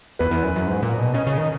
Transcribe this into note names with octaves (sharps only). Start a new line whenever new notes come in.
E2 B4
E2
F#2
F#2
G#2
A#2
B2
C#3 D#5
C#3
D#3